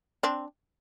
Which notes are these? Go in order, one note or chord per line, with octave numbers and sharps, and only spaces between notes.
C4 D4